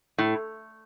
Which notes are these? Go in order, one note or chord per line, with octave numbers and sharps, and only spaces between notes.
A2